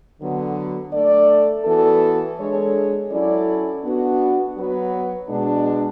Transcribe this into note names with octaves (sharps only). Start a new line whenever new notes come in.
D3 F#3 B3
A3 D4 A4 D5
E3 B3 F#4 A4
G#3 D4 A4 C#5
F#3 C#4 E4 A4 D5
B3 D4 F#4
F#3 B3 F#4 B4
B2 G#3 D4